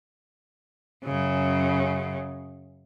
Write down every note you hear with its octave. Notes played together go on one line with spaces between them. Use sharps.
F#2 C#3